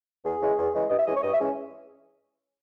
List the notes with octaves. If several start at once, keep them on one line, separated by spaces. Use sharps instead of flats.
E2 G#4
C#3 E3 G#3
E2
C#3 E3 G#3
G2 D#5
E5
E3 G#3 C#4 D#5
C#5
G2 D#5
E5
E3 G#3 C#4